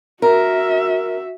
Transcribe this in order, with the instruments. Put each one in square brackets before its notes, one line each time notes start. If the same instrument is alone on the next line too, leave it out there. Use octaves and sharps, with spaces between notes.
[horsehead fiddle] F#4 E5 [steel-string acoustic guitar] A#4